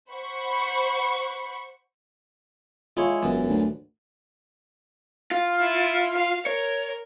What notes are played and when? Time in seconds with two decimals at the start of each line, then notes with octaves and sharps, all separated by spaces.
0.11 C5 F#5 B5 C#6
2.97 G#3 E4 F4 C#5
3.22 E1 F#2 E3
3.49 D2
5.31 F4
5.61 E4
6.17 F5
6.46 A#4 C#5